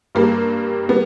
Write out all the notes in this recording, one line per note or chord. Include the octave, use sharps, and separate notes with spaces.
G2 G3 A#3
G3 B3